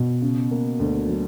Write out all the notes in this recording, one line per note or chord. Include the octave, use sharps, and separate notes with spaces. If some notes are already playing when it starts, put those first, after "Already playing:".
Already playing: B2
C#3
A#3
D2
F#3